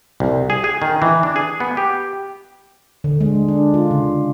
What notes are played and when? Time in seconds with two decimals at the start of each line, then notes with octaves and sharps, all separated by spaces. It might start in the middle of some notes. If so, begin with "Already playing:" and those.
0.20 C2
0.50 G#4
0.64 G#4
0.82 D#3
1.02 E3
1.23 D4
1.36 G#4
1.60 B3
1.77 G4
3.04 D3
3.21 G#3
3.48 D4
3.74 F4
3.91 C#3